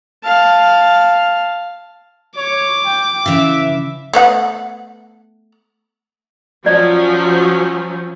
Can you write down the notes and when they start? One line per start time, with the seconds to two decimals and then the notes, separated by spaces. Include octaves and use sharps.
0.24 F5 A5
2.37 C#5 D6
2.85 G5
3.26 C#3 E3 E5
4.13 A3 B3 F#5
6.66 F3 F#3 C#4 D5